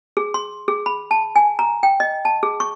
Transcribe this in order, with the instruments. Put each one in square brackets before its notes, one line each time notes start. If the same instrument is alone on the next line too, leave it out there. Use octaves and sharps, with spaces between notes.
[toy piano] G#4
C6
G#4
B5
A5
G#5
A#5
G5
D#5
A5
G#4
C#6